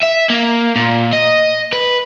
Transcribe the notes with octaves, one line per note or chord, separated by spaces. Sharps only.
E5
A#3
A#2
D#5
B4